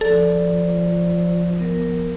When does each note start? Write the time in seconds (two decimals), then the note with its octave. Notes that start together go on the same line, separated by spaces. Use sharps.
0.01 F3 A4 D5
1.59 B3 A#4